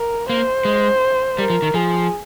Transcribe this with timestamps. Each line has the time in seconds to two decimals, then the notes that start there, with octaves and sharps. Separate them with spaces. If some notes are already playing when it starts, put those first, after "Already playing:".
Already playing: A#4
0.29 A#3 C5
0.65 G#3
1.38 G3 A#4
1.50 F3
1.62 D#3
1.74 F3 G#4